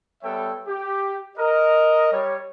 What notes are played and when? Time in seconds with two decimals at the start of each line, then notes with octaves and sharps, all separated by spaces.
0.23 G3 B3 A4 C#5 E5 G5
0.67 G4
1.38 A#4 D#5
2.12 G3 C#5